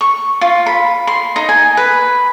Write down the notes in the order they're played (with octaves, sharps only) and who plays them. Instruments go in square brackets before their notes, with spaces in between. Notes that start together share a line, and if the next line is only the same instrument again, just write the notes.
[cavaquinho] C#6
F4
B5
C6
D#4
G#5
B4